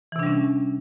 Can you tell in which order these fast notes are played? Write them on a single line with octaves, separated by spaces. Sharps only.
E3 C3 D4 G3 C#4